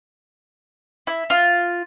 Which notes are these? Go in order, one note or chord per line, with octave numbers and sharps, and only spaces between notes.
E4
F4